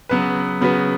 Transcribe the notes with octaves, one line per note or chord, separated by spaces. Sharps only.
C#3 F#3 B3 F#4 B4
C#3 F#3 B3 F#4 B4